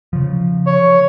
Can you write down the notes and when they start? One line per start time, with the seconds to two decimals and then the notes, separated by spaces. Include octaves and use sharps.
0.13 C#3 F3
0.66 C#5